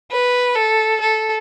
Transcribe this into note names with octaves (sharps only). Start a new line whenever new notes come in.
B4
A4
A4